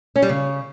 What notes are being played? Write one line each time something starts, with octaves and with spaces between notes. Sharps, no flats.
C#4
G3
C#3